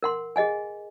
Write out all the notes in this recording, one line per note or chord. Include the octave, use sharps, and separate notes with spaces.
A#4 F#5 C6
G#4 D#5 F#5 G#5